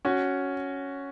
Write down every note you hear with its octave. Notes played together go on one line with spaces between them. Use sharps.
C#4 F#4